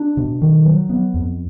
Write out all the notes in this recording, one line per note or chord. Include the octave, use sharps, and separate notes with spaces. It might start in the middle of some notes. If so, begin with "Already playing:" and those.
Already playing: D4
B2
D#3
F#3
B3
F2